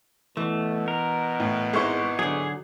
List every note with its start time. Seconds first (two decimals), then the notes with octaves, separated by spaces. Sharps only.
0.37 B2 E3 A3
0.88 A#4
1.40 A2
1.73 G#1 G#3 E4 C5 C#6
2.19 D3 F#3 G#4